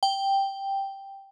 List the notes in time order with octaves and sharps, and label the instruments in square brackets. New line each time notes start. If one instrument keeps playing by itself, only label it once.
[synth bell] G5